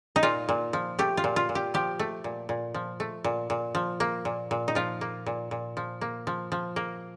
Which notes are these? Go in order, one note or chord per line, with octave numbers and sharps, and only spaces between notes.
D#4
A#2 F4
A#2
F3
A3 G4
F4
A#2
F4
A#2
G4
F3 G4
A3
A#2
A#2
F3
A3
A#2
A#2
F3
A#3
A#2
A#2
D#4
F3 F4
A#3
A#2
A#2
F3
A#3
F3
F3
A#3